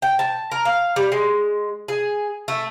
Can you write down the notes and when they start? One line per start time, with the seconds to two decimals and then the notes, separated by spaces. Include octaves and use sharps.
0.02 G5
0.19 A5
0.51 A#4
0.65 F5
0.96 G3
1.12 G#3
1.88 G#4
2.48 A3